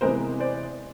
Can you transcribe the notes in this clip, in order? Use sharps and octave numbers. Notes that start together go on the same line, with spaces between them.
C3 E3 G#3 B3 A#4 C5
C5 D5